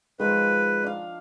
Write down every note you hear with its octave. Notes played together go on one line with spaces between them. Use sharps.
D#3 F3 G#3 B4
D4 F5